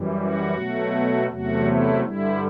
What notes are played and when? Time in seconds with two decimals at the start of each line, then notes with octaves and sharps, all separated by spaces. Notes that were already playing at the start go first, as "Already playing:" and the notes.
Already playing: F#2 E3 G3
0.17 F#4
0.54 B2 F#3 A3
1.28 E2 C3 F#3 A3 F#4
1.65 E4
2.02 G2 D3 G3 E4